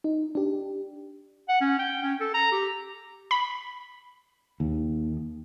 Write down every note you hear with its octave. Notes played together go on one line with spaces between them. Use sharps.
D#4
D4 G4
F#5
C#4
G5
C#4
A4
A#5
G4
B5
D#2